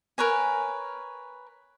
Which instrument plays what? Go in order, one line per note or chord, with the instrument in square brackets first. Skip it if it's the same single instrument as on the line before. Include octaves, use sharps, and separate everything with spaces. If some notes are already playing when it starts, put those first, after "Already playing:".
[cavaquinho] A#4 B4 C#5 G#5